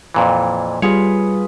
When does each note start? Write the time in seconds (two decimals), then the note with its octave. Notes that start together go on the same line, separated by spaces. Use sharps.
0.14 F2 A#2 E3
0.82 G3 F4 G#4 B4 C#5